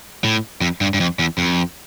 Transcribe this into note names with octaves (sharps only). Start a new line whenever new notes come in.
A2
F2
G2
G2
F2
E2
F2